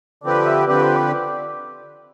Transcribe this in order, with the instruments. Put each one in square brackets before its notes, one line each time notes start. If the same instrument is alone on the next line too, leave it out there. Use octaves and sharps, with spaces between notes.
[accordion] D3 F3 C4 G4 B4 [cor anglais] D5
[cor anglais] E5
[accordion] D3 F3 C4 G4 B4 [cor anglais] D5
[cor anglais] C5
D5